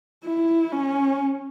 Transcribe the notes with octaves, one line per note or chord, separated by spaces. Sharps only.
E4
C#4